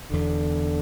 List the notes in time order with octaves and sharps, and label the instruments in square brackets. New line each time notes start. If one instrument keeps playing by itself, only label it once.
[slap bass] E1 E2 B2 [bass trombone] D3